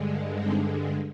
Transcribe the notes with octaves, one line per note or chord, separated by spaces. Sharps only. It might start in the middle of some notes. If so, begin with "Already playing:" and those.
Already playing: G2 D3 G#3
C4 D#4